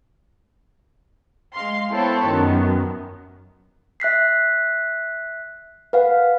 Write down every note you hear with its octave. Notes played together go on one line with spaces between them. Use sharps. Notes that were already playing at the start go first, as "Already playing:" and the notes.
G#3 F5 C6
B3 C4 E4 A4 C#5 A5
F#2 D#3 B3
E5 F#6 B6 C7
B4 F5 F#5